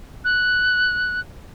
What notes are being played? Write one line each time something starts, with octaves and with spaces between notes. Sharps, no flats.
F#6